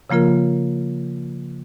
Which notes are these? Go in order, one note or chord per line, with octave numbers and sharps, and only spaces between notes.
C#3 F3 A#3 F4 A#4